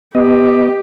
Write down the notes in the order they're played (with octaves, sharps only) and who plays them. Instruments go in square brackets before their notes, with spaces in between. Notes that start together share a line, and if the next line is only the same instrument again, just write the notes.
[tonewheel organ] B3 D#5 [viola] G4